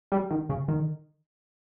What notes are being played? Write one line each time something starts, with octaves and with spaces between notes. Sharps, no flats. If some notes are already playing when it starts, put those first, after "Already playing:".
G3
D#3
C#3
D#3